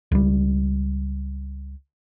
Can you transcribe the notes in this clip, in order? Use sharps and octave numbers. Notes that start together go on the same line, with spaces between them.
C#2 G3